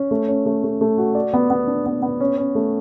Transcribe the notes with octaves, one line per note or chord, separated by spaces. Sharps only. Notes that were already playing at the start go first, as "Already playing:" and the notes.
Already playing: C#4
A3
C#4
A3
A3
A3
F#4
D5
B3
B3
D4
B3
B3
C#4
C#4
A3